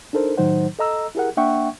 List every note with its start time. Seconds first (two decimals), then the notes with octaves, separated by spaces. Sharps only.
0.13 D4 D#4 A4 A#4 C5
0.37 A2 D#3 F#3 D#4 C5 F#5
0.79 A4 D#5 A#5 E6
1.15 E4 G4 G#4 A#4 F#5
1.37 A#3 D4 E5 F#5 G5 C#6